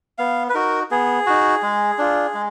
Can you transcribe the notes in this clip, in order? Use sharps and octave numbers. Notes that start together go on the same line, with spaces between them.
B3 F5
B4
D#4 F#4 A#4
B3 G#4
D#4 F#4
G#3
D4 F4
G#3